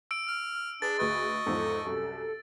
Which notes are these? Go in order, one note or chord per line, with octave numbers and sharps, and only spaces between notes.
E6 D7
F6
D4 G#4 B4 A6
D2 B4 D#5 C#6
E2 G#2 F3 A4
C2 F#2